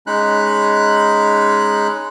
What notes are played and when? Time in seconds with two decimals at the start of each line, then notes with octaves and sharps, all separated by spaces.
0.07 G#3 C#4 D#4 B5 F#6